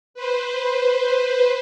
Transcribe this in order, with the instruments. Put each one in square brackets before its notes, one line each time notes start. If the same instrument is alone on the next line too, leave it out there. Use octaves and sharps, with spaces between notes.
[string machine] B4 C5